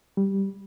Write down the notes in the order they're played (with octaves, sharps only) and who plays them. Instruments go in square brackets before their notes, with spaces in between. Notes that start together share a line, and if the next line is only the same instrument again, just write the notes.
[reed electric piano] G3